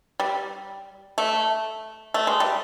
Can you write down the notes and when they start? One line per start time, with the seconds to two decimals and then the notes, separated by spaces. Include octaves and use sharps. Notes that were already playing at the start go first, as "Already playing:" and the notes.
0.20 G3
1.18 A3
2.14 A3
2.27 G#3
2.40 G3